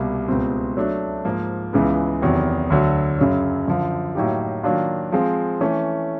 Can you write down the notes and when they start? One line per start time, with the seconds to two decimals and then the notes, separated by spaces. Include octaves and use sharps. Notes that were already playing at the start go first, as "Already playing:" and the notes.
Already playing: C2 B2 G3 A#3
0.28 C#2 B2 G3 C4
0.77 F#3 A3 D4
1.25 G#2 F3 A#3
1.73 C#2 C#3 E3 G#3 B3
2.22 E2 C3 D#3 F#3
2.70 D2 D3 F#3
3.18 F#2 C#3 F#3
3.67 F#2 D3 F3
4.15 A2 F#3 A#3 D#4 G4
4.63 D#3 F#3 A#3 D4 F4
5.12 F3 G#3 C4
5.61 E3 A3 C#4